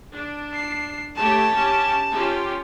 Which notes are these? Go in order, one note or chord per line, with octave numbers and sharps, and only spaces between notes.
D4
C7
A3 G4 C#5 A5
C#4 G4
C#4 F4 G4